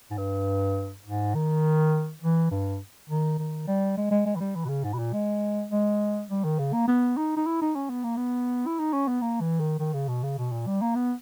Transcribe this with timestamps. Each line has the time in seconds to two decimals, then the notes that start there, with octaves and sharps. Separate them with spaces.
0.11 G#2
0.17 G2
1.05 G#2
1.35 D#3
2.22 E3
2.51 G2
3.09 D#3
3.38 D#3
3.67 G3
3.97 G#3
4.11 G#3
4.26 G#3
4.36 E3
4.40 G3
4.55 E3
4.64 B2
4.69 C#3
4.84 G#2
4.93 B2
4.98 A#2
5.13 G#3
5.71 G#3
6.30 G3
6.44 D#3
6.59 C#3
6.73 A#3
6.88 B3
7.17 D#4
7.37 D#4
7.46 E4
7.61 D#4
7.75 C#4
7.90 B3
8.03 A#3
8.16 B3
8.66 E4
8.79 D#4
8.93 C#4
9.08 B3
9.21 A#3
9.41 E3
9.60 D#3
9.79 D#3
9.93 C#3
10.08 B2
10.23 C#3
10.38 B2
10.52 A#2
10.67 G3
10.81 A#3
10.95 B3